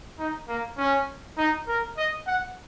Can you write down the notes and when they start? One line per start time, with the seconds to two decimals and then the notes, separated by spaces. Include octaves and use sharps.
0.18 D#4
0.48 A#3
0.77 C#4
1.37 D#4
1.67 A#4
1.97 D#5
2.27 F#5